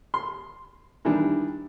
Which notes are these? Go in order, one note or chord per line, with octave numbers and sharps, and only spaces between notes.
C6
D#3 E3 G3 D4